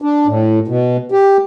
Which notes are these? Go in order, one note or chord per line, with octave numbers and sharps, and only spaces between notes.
D4
A2
B2
G4